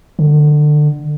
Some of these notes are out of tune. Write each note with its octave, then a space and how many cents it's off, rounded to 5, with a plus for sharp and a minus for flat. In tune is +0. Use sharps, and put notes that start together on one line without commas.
D3 +25